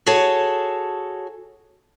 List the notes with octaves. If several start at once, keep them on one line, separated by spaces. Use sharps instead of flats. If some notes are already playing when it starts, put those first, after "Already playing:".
F#4 G#4 A4 C#5 A5